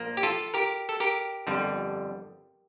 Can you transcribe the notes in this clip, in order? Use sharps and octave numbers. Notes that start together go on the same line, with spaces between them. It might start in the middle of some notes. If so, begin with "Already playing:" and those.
Already playing: A#1 A#2 F3 A#3
G4
F4 A4
G4 A#4
A4
G4 A#4
G1 F2 D3 G3